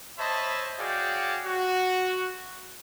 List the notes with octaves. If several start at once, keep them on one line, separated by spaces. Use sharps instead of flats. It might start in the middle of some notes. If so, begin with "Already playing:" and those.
C5 C#5 D#5 E5 A5 B5
F#4 G#4 C#5 D5 F5 G5
F#4